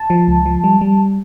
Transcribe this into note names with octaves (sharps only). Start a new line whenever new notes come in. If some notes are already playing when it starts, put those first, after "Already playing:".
Already playing: A5
F3
C#2
F3
G3
G3